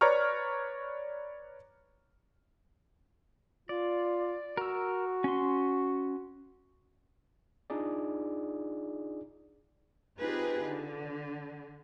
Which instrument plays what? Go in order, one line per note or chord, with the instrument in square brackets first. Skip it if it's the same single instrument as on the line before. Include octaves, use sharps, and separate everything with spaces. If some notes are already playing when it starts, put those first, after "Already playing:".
[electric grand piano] B4 C#5 D5 A#5 C#6 F6
[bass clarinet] F4 [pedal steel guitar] D5
[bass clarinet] F#4 [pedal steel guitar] A#4 E6
[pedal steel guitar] C#4 C6
[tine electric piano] D4 D#4 F4 G#4 D5
[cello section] C4 D#4 F4 G4 G#4 B4
D3